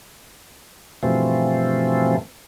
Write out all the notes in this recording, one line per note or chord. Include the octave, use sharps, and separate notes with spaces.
G2 B2 E3 F3 A3 C4